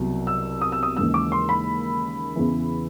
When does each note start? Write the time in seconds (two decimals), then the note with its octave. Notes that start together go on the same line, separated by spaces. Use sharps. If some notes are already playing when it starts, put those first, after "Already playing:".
Already playing: C2 B2 F#3
0.27 E6
0.61 D#6
0.72 E6
0.83 D#6
0.97 D#2 C#3 E3 G#3 E6
1.14 D6
1.32 C6
1.49 B5
2.36 E2 C#3 E3